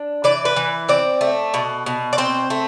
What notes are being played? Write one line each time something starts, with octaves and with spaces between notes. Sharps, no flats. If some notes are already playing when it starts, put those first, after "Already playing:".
Already playing: D4
E3 D5
B4
E3
C4 D5
A3
B2
B2
D5
C4 C5
A3